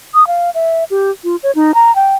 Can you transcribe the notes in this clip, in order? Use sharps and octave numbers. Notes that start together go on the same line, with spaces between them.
D#6
F5
E5
G4
F4
C#5
D#4
A#5
G5